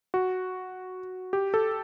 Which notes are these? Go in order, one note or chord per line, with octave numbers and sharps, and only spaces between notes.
F#4
G4
A4